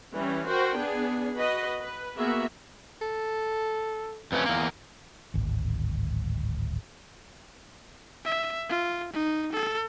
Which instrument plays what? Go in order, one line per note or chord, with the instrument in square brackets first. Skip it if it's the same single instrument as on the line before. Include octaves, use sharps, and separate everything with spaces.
[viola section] E3 G3 C#4
F#4 A#4 C5 G5
B3 D4 G#4
F#4 B4 D#5
B4
A#3 B3 F#4 G#4 E5
[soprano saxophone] A4
[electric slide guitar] F2 A3 C#4 [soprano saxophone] B4
[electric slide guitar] E2 A#3 [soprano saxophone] F5
[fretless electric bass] D1 G#1
[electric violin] E5
F4
D#4
A4